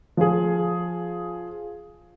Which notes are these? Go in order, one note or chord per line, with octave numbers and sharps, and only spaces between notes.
F3 G#4